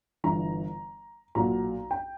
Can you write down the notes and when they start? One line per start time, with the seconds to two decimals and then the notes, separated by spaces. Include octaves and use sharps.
0.24 G1 G2 E3 A#5
1.35 B1 A#2 F#3 A#5
1.91 G5